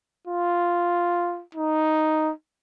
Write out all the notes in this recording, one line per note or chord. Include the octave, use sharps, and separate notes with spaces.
F4
D#4